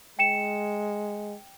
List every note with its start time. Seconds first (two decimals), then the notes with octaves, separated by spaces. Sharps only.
0.19 G#3 G5 C#7 E7